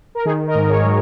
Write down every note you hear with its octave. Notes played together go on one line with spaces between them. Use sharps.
A#4
D#3 D#4 G#4
A#4 D#5
G#2
G#4 C#5
F#3